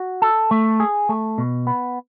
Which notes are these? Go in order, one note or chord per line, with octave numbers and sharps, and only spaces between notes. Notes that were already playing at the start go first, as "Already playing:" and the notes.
Already playing: F#4
A4
A3
G#4
A3
B2
B3